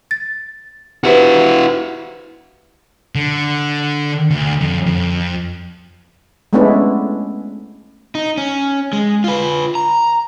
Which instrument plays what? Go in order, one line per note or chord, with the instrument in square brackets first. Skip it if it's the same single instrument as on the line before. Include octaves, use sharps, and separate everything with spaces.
[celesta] A6
[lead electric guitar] E4 F#4 [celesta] G4 B4 C5
[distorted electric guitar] D3
D2
F2
F2
[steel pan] G#3 A3 B3 C#4 D4 E4
[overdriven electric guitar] D#4
C#4
G#3
F4 B4
A#5